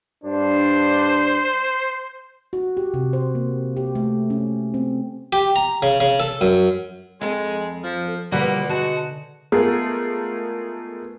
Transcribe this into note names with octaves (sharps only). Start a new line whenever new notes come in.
G2 D4 C5
F#4
G4
C3
C5
A#3
G4
A3
C#4
C4
G4
A#5
C#3
C#3
A4
F#2
F2 G#3 A4
F3
B2 D3 G3 A#3 F4 B4 F#5
G#3 D#4 F#4 A5
G#3 A3 B3 F4 G#4 A#4